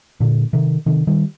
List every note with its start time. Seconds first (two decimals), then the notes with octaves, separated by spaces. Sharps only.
0.20 A#2 D3
0.53 C3 D#3
0.86 C3 D#3
1.07 D#3 G3